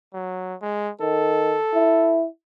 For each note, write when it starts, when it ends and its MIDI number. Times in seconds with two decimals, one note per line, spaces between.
0.14 0.55 54
0.61 0.91 56
1.01 1.56 51
1.01 2.23 69
1.74 2.26 64